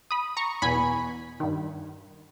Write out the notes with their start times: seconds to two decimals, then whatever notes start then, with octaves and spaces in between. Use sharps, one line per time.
0.11 B5 D#6
0.37 A#5 C#6
0.62 E2 B2 G#5 B5
1.40 G2 D#3